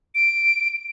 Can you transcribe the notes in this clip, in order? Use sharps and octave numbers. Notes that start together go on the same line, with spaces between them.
D7